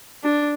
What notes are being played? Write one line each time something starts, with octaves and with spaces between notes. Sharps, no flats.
D4